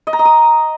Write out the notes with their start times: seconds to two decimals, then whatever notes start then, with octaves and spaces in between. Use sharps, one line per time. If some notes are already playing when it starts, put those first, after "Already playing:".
0.07 D#5
0.13 A#5
0.19 D#5
0.25 D#6